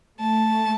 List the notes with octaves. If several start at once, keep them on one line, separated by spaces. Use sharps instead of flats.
A3 A5